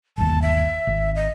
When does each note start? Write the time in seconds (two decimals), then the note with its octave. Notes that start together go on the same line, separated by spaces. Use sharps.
0.18 G1 D#2 A5
0.42 E5
0.87 G#1
1.16 D#5